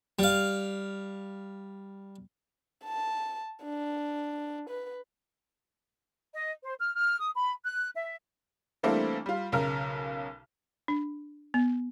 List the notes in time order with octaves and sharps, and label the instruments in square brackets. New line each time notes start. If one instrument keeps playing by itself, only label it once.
[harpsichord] G3 F5
[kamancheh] A5
D4
B4
[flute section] D#5
C5
F6
F6
D#6
B5
F#6
E5
[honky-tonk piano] E3 G3 A3 A#3 C4 D4
G3 F4
B1 C#3 A#4 F6
[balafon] D4
B3